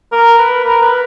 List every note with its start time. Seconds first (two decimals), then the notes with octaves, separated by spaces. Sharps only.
0.12 A#4
0.38 B4
0.64 A#4
0.81 B4